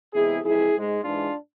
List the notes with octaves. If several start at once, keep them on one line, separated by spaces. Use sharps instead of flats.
E2 C3 G#3 E4 G#4
F2 C3 E3 G#3 E4 G#4
G#2 G#3
G#2 E3 G#3 D4 F4